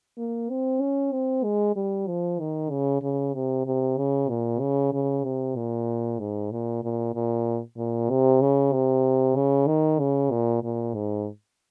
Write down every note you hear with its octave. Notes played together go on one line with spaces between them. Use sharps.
A#3
C4
C#4
C4
G#3
G3
F3
D#3
C#3
C#3
C3
C3
C#3
A#2
C#3
C#3
C3
A#2
G#2
A#2
A#2
A#2
A#2
C3
C#3
C3
C#3
D#3
C#3
A#2
A#2
G#2